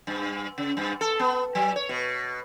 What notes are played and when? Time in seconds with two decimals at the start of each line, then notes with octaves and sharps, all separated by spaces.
0.07 G2
0.58 C#3
0.77 G2
1.01 A4
1.19 B3
1.55 F#3
1.76 C#5
1.89 B2